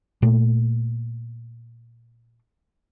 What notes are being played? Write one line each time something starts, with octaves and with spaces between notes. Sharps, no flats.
A#2 A3